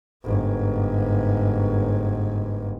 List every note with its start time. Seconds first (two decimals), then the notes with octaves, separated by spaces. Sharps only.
0.24 G1 G#2